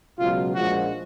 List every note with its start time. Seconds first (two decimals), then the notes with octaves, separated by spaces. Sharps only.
0.19 C#2 B2 F#3 F4
0.54 A#1 A#2 F3 G#3 F#4